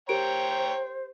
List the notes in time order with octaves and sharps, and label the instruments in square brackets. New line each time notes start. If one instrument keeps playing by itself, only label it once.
[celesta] G4 A#4 D7 [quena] C5 [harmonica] C#5 G5 A#5